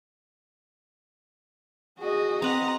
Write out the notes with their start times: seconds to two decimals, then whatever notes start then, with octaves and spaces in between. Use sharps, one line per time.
1.99 F#4 G#4 D#5
2.42 C4 B4 D#5 F#5 A#5